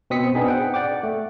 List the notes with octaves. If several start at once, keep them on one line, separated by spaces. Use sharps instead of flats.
B2 C4 D#6 B6 C#7
B3 C4 D4 D#4 G#4
F#5 G5
D5 F#5 G5 D6
A3